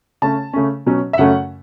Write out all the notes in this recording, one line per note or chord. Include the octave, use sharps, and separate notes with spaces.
C#3 A3 C#4 A5
C#3 A3 C#4
B2 F#3 C#4
E5
F#2 C#3 A3 C#4 F#5